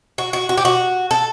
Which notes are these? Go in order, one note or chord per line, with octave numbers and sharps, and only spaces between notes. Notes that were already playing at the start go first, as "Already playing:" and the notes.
F#4
F#4
F#4
G4
F#4
A4